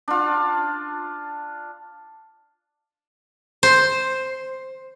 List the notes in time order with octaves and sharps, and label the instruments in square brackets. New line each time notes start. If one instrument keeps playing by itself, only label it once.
[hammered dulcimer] D4 F4
[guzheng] C5